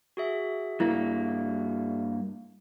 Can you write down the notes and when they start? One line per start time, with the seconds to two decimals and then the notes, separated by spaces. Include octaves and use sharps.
0.17 F#4 G#4 E5
0.80 G2 A#3 E4